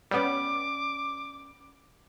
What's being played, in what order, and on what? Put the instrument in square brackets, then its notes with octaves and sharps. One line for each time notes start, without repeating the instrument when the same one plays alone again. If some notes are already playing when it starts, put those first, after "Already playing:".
[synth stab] G3 B3 [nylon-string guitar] C#4 D5 [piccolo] D6